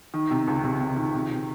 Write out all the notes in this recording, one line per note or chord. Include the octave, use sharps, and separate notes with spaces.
D#3
C3
C#2
C3
C3
D#3
C3
C3